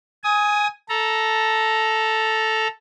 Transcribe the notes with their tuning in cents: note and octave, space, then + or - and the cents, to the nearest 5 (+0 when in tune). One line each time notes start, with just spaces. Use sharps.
G#5 +0 D#6 +20
A4 +0 A#5 +10